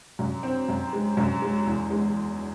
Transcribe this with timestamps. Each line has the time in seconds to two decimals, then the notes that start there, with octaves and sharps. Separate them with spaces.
0.19 F#2
0.43 C4
0.69 F#2
0.93 G#3
1.17 F#2
1.42 G#3
1.66 E2
1.91 G#3